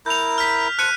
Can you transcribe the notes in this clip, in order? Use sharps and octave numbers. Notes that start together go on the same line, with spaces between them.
E4 A#4 A#5 G6 F7
F6 B6
C5 A5 F#6 C#7 D#7